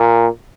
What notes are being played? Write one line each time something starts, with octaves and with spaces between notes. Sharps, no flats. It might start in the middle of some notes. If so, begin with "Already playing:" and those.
Already playing: A#2